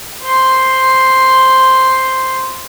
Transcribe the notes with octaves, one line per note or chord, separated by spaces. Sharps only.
C5 C6